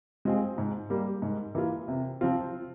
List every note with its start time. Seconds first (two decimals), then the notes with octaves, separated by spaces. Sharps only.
0.25 G#3 C4 F4 G#4
0.58 G#2
0.90 G3 A#3
1.22 G#2
1.55 E3 A#3 F4
1.88 C3
2.21 F3 C4 F4